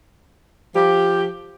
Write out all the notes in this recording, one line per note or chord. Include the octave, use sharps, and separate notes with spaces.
F3 G4